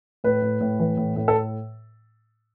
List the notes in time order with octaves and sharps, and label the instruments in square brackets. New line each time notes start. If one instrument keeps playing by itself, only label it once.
[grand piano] A2 B4
A2
A2
E3
A2
A2
A4